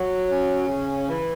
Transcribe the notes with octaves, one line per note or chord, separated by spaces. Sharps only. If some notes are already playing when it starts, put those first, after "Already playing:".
Already playing: F#3
C#4
C#3
E3